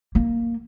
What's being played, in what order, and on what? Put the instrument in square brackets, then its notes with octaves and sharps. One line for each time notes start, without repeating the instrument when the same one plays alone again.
[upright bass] A#3